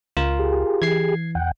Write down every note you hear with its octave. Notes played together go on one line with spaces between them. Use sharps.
C#2 F4 A#4
G4 G#4
E3 G#6 C7
E2 F#5 G5